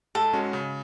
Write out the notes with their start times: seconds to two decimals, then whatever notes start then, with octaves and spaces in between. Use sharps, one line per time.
0.15 G#2 A4
0.33 G#3 C#4 F#4
0.53 C#3